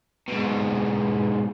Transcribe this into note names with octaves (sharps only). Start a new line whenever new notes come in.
G#2 B2